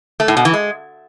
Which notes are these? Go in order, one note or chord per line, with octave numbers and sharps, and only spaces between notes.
A3
A2
B2
E3
G#3